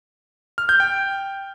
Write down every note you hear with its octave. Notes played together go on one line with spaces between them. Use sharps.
F6
G6
G5